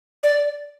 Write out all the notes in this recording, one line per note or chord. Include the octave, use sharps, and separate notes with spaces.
D5